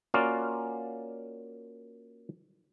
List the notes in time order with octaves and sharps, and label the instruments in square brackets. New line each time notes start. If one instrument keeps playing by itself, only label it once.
[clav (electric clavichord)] A#3 C#4 F4 F#4 D5 F5